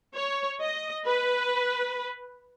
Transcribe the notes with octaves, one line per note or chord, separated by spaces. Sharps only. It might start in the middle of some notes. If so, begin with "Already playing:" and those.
C#5
D#5
B4